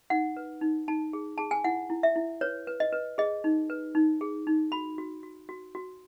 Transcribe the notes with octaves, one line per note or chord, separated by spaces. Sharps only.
D#4 F#5
B4
D#4
D#4 A5
G#4
G#4 A5
G#5
E4 F#5
E4
E5
E4
B4 C#5
B4
D#5
B4
G#4 D#5
D#4
B4
D#4
G#4
D#4
F#4 B5
F#4
F#4
F#4
F#4